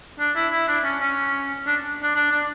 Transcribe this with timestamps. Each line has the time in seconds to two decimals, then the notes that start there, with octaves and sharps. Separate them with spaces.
0.19 D4
0.36 E4
0.52 E4
0.68 D4
0.84 C#4
1.01 C#4
1.67 D4
2.03 D4
2.15 D4
2.31 D4